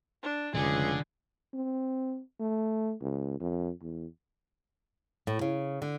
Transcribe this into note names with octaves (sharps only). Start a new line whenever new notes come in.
D4
F1 C#2 D3 G#4
C4
A3
C#2
F2
E2
A2
C#3
D3